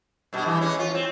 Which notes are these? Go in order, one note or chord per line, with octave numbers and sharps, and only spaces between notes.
G2 B2
E3
G#3 C#4
F4
C4